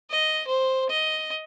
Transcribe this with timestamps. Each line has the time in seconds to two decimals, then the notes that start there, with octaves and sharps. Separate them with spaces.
0.10 D#5
0.47 C5
0.89 D#5